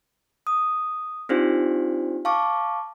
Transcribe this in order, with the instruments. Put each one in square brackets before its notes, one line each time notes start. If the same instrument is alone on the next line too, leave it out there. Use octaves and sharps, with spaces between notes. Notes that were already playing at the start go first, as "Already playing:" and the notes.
[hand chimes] D#6
C4 D4 D#4 F4 G4 C5
F5 A5 C#6 D6